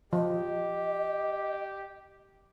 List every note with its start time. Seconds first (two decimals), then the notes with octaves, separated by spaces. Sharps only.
0.13 F3 G4 D#5